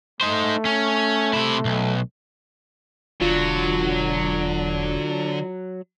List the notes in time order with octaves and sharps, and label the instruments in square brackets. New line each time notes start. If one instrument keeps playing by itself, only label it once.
[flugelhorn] A3 [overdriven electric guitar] D#4 C5
[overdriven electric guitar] C#4
C3 E4
B1
[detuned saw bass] E1 [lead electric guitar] D3 [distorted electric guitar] F#3 [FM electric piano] F4